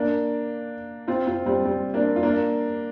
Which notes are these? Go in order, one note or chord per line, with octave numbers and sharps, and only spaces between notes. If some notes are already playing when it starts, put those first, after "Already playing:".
Already playing: A#3 D4
C4 F4
C4 F4
G3 C4
G3 C4
A#3 D4
F4
A#3 D4